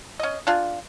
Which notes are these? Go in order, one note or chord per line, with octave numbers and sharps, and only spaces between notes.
C#4 D#5
D4 F4 G#4